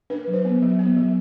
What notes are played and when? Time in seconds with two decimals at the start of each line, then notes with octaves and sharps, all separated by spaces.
0.10 D4 B4
0.28 F#3
0.33 C5
0.45 B3
0.62 F#3
0.79 B3
0.96 F#3